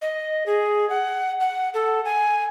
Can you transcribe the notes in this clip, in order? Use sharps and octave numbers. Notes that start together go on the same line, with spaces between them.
D#5
G#4
F#5
F#5
A4
G#5